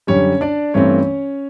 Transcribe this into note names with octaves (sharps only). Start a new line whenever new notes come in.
F#2 D3 G3 C#4 C#5
D4 D5
G2 E3 A3 C4 C#4 C#5